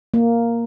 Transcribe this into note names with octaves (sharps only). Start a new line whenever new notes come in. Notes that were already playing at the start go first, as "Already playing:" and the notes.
A#3